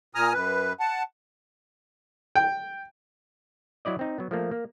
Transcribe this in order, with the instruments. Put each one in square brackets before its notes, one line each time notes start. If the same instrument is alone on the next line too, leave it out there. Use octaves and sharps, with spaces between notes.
[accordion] A#2 G#5 A#5 D#6 F6
F#2 B4
F#5 A5
[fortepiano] G5
[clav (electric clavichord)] F#3 E4 D5 D#5
C4 D#4
F#3 B3
F3 A3 A#3
A#3